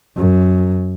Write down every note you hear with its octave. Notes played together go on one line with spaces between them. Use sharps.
F#2